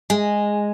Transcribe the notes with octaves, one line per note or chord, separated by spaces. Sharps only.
G#3